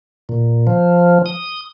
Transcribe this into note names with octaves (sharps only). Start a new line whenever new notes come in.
A#2
F3
D#6